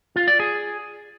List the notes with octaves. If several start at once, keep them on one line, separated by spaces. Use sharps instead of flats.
F4
D5
G#4